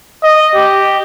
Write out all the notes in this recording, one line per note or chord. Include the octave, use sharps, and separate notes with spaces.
D#5
G4